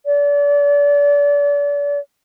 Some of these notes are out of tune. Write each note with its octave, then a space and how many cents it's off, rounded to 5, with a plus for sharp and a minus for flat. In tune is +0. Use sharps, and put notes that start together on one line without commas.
D5 -35